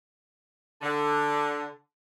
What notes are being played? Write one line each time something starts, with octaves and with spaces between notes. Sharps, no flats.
D3